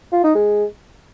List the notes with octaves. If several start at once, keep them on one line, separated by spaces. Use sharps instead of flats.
F4
D#4
G#3